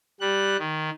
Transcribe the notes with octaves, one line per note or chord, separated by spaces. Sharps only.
G3 F#6
D#3